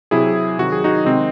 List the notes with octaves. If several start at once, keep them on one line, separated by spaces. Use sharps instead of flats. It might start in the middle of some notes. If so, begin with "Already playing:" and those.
C3 F#3 E4 G#4
C3 D#3 F#3 F#4
G#4
D#4 F#4
C3 D#3 G#3 C4 D#4